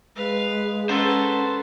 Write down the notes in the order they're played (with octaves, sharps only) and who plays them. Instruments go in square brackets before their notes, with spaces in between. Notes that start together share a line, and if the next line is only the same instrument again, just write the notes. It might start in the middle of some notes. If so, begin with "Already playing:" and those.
[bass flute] G#3 [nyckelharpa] B4 F5
[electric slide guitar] C#4 F#5 A#5 [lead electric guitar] A4 C5 [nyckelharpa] B4 A5